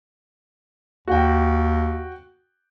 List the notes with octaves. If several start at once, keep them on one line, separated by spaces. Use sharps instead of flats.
D#2 F#4 G5